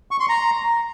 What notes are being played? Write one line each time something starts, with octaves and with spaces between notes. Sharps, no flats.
C#6
C6
A#5